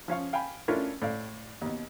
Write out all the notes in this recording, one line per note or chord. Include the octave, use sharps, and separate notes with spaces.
F3 C#4 F5 C#6
F5 G5 G#5 B5
A3 C#4 D4 E4 F4 A#4
A2 D5 F5
D#2 B2